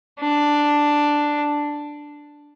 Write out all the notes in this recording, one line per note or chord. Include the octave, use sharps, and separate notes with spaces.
D4